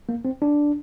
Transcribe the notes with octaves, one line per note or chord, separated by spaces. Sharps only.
A#3
C4
D4